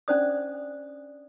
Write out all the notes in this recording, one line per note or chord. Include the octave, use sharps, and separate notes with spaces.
C#4 D4 C5 D5 D#6